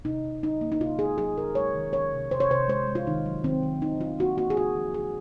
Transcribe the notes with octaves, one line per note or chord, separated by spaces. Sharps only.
C3 D#4
C3
F#3 D#4
A#3
D#4
C3 F4
C3 G#4
F#3 G#4
C3 A#4
G#3 C#5
D#3
D#3 C#5
C3
C3 C5
C#5
C3 C5
G#3 C5
G#3
F4
D#3 D#4
F#3
D#3 C4
D#3
D#3 D#4
F#3 F4
A#3 F#4
A#3 F#4
G#4
C#3 F#4
F3
C#3 G#4